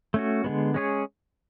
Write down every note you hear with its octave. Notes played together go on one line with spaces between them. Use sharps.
A3 C#4 F#4
D3 G#3 B3
G#3 C#4 G#4 C#5